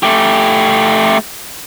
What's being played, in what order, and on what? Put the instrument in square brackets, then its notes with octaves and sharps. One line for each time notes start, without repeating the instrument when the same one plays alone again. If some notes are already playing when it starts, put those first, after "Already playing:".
[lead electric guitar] A3 G4